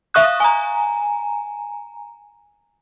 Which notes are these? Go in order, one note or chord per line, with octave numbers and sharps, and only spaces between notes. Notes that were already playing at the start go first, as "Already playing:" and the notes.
E5 F5 C#6 D#6 F#6
G#5 A#5